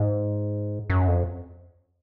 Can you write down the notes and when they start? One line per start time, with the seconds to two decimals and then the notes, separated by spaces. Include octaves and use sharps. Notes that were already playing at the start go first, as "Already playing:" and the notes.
Already playing: G#2
0.90 F#2
1.08 F2